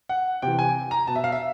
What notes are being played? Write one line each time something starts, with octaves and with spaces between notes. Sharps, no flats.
F#5
C3 E3 G5
G#5
A#5
B2 A5
E5
F5
E5